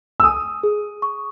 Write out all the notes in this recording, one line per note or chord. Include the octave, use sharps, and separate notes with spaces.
E6
G#5 D#6
G#4
C#6